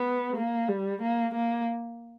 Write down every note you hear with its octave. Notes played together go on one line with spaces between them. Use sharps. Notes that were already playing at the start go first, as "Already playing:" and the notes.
Already playing: B3
A#3
G3
A#3
A#3